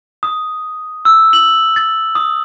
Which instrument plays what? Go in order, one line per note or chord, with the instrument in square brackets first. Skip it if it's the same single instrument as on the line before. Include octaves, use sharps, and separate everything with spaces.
[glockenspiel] D#6
E6
F#7
A6
D#6